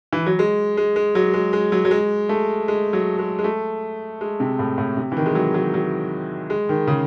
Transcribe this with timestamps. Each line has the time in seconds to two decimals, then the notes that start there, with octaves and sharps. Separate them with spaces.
0.13 E3
0.26 F#3
0.39 G#3
0.77 G#3
0.96 G#3
1.15 F#3
1.34 G#3
1.53 G#3
1.72 F#3
1.85 F#3
1.91 G#3
2.29 A3
2.68 G#3
2.93 F#3
3.19 G#3
3.39 G#3
3.44 A3
4.21 G#3
4.40 C3
4.59 A2
4.78 A2
4.97 C3
5.12 E3
5.17 D#3
5.26 G#3
5.35 F#3
5.54 F#3
5.74 F#3
6.50 G#3
6.69 D#3
6.87 C#3